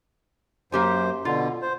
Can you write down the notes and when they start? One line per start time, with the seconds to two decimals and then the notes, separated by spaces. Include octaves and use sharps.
0.72 F#2 A#3 G4 C5 G#5
1.25 B2 D3 F4
1.62 C5